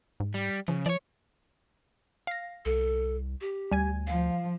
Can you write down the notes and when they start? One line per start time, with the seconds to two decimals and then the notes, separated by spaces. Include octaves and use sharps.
0.20 G#2
0.34 G3
0.68 C#3 F3
0.86 F3 C#5 D5
2.27 F5 A#6
2.65 C2 A4
3.41 G4
3.72 D2 G3 G#5 G#6
4.07 F3 F5